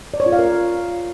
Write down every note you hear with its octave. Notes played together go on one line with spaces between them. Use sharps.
D5
C#5
F4
F5
A#4